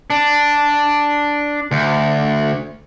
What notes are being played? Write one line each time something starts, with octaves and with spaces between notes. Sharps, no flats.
D4
D2